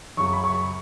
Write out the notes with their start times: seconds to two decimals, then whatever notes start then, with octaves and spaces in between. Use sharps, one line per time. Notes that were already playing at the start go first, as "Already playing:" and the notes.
0.17 F#2 C#3 F#3 C#6
0.33 B5
0.44 C#6